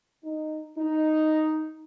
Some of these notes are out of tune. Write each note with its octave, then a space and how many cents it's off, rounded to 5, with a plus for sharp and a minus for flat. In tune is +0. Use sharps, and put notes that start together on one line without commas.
D#4 -10
D#4 +0